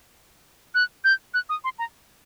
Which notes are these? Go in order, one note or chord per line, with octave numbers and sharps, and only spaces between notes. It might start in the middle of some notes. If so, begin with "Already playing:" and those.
F#6
G6
F#6
D#6
C6
A#5